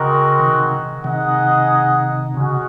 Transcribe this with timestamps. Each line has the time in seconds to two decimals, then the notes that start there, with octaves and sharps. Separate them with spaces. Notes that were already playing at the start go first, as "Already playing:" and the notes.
Already playing: C#3 G#3 C4 F#4 A#4 D#5
0.39 C3 D#3
1.04 C3 D#3 D#4 G#4 D#5 F#5
2.34 C#3 G#3 C#4 F#4